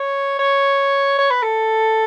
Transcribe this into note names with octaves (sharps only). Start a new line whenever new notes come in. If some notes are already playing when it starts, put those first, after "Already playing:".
Already playing: C#5
C#5
C#5
B4
A4